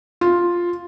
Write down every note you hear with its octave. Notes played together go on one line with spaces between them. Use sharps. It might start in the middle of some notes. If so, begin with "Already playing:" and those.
F4